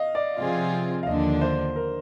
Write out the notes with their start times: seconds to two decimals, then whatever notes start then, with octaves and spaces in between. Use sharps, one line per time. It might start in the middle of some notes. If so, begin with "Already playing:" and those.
Already playing: D#5 F5
0.15 D5
0.38 C3 F3 C4 F4 G#4 F5
1.03 F5
1.07 D#2 D3 F3 A#3 D4 D#5
1.41 C5
1.76 A#4